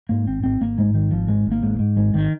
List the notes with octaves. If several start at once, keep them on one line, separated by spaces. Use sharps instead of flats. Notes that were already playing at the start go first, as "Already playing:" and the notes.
G#2 A#3
G#1 C4
G#1 C4
G#1 A#3
G#2 G#3
G#1 D#3
G#1 F3
G#2 G#3
G#1
A#3
G#2
G#2
G#1 G#3
G#1 D#3